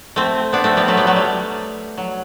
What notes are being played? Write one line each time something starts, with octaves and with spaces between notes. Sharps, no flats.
A3 C4
B3 D4
A3 C4
G3 B3
F#3 A3
G3 B3
F#3 A3
G3
F#3